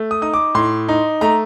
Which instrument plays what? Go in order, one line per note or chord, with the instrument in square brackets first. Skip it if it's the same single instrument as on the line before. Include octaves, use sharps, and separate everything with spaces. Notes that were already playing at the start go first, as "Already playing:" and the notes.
Already playing: [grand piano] A3
D#6
D#4 D#6
D6
A2 C6
D#4
A3 A#5